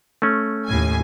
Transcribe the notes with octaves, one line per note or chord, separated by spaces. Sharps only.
A3 C#4
D#2 A2 G#5